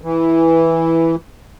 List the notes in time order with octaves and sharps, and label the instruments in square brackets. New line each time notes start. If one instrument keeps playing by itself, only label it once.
[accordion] E3